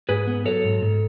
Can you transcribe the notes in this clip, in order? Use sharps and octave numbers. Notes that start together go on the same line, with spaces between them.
G#2 G#4 B4
B3
F#3 A4 C#5
G#2
G#2